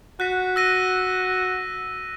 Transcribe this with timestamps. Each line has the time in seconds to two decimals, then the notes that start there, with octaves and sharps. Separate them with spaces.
0.20 F#4 F#6 B6
0.56 E6 A#6 D#7